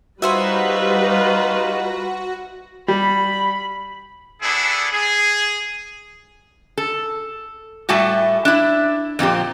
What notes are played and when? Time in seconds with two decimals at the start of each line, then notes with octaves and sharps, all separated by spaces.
0.22 G3 D#4 F4 F#4 G#4 B4 C5 E5
2.88 G3 B5
4.42 B3 D4 E4 G#4 A4
4.91 G#4
6.78 A4
7.89 A2 G3 A3 F#4 E5 A5
8.45 D4 E4
9.19 F2 A#2 C4 G4